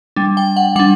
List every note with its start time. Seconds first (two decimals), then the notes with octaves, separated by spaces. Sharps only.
0.16 G3 D4
0.37 G5
0.57 F#5
0.76 G3 D4 F#5